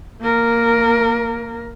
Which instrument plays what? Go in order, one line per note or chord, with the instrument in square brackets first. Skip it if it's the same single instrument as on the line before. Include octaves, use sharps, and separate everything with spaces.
[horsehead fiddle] A#3 A#4